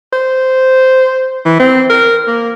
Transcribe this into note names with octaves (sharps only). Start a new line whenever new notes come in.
C5
E3
C4
A#4
A#3